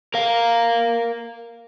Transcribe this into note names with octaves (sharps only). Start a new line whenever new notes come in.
A#4 F5